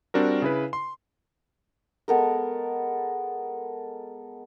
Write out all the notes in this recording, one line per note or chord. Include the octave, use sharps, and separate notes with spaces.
G3 C4 D4 F#4 A#4
C#3 E4 B4
C6
G#3 B3 A4 A#4